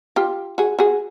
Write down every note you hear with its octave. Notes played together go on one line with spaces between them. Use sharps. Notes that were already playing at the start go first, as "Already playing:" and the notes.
F4 G4
F#4 G#4
F#4 G#4